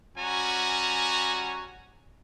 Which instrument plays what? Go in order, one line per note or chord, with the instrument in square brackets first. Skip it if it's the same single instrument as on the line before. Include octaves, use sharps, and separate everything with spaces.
[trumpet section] G3 C#4 F#4 G#5 A#5